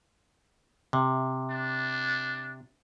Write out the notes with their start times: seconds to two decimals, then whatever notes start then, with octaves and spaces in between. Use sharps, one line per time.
0.93 C3
1.50 D4